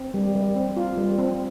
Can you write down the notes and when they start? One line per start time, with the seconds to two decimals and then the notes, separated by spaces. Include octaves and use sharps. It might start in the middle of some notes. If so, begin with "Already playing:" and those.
Already playing: C4
0.14 G3
0.35 G3
0.56 C4
0.77 F4
0.97 G3
1.19 C4